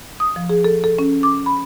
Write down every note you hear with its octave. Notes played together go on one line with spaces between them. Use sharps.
D#6
F3
G#4
A4
A4
C#4
D6
B5